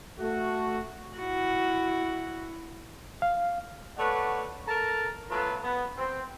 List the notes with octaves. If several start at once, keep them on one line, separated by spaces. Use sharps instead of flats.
A3 F#4
E4 F#4
F5
A3 B4 C#5 D5 F#5
A4 A#4 A5 A#5
F#3 A3 B3 F4 A4 B4
B3
C4